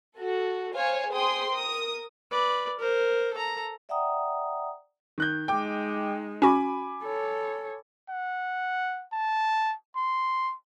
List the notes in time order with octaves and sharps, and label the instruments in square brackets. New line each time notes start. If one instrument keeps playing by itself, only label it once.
[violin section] F#4 A4
C5 C#5 F5 G#5
G#4 C5 G5 C6 D#6
A#4 D#6
[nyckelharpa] B4 D5
A#4 C5
A4 A#5
[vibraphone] D5 E5 F#5 G5 A#5 D#6
[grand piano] D#3 F#6 G6
[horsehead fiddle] G#3 D#4 [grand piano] G5 D6
[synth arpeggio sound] C#4 F#4 [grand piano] G#5 B5 D6
[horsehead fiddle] A4 C#5
[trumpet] F#5
A5
C6